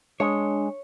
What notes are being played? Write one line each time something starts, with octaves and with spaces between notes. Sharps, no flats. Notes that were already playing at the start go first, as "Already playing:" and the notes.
G#3 D4 C#5